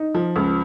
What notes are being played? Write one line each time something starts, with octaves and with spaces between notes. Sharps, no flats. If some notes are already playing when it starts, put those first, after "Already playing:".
Already playing: D#4
F3
C#2